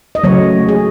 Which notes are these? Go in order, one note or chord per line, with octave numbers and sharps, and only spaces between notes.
D#5
C#3 F#3 A3 C#5
G#4